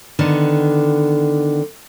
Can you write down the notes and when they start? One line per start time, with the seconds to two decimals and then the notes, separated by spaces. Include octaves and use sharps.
0.19 D3 D#3 B3